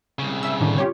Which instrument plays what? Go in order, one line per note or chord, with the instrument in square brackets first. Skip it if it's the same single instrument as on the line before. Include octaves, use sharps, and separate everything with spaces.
[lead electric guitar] C2 C#3
[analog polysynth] E5 E6
A2 D3 D#3
F4 G4 C#5